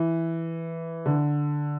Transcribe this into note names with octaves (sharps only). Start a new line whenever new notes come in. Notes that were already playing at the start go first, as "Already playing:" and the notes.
Already playing: E3
D3